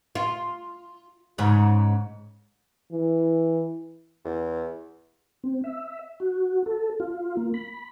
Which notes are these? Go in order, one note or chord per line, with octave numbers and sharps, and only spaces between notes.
F4
G#2 C#3
E3
E2
C4
E5
F#4
A4
F4
A#3
B5